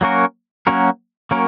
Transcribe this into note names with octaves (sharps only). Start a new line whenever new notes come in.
F#3 A#3 C#4 F#4 A#4
F#3 A#3 C#4 F#4 A#4
F#3 A#3 C#4 F#4 A#4